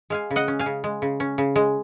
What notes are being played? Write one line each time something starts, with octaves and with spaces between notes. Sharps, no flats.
G#3 F5 G#5
C#3
D#5 F#5
C#4
F5 G#5
C#3
G#3
C#3
C#4
C#3
G#3